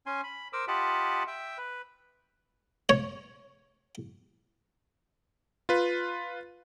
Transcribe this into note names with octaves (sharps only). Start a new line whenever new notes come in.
C#4 G#5 C6
B5
A#4 C5 D6 E6
F4 G4 D#5 F#5 A5 B5
E5 G5
B4
C#5
F4 B4